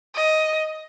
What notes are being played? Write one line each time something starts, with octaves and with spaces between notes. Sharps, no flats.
D#5